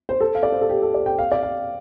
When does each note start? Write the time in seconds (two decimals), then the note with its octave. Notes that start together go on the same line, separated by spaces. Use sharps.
0.09 C5
0.20 A4
0.35 F5
0.43 D5
0.52 C5
0.61 A4
0.69 G4
0.82 A4
0.94 D5
1.06 G5
1.19 F5
1.32 D5
1.43 F5